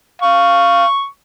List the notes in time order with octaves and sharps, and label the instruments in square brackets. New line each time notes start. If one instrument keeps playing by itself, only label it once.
[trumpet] F5 [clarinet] C#6